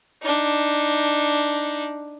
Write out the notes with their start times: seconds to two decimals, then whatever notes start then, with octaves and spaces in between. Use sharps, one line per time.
0.22 D4 D#4